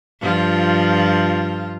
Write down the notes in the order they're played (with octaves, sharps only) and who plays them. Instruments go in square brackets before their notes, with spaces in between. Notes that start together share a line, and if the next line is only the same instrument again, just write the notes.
[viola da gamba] G2 F3 F4